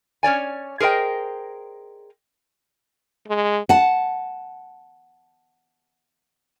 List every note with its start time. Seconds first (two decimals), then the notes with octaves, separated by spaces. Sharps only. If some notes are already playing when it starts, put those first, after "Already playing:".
0.23 C#4 C#5 D5 G#5
0.80 G#4 A#4 C5 D#5 G5
3.28 G#3
3.69 F#5 A5